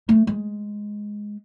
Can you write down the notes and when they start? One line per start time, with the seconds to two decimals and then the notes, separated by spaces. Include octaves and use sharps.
0.09 A3
0.27 G#3